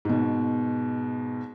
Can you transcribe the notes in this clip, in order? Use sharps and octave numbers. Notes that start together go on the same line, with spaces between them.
G#2 B2